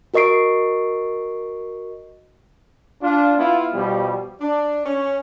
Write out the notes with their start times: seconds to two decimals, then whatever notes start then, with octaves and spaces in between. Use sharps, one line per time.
0.14 F#4 A#4 D#5 C#6 C7 D7
3.02 D4 F4
3.37 B3 E4 F4
3.73 B2 F3 G3
4.40 D4
4.86 C#4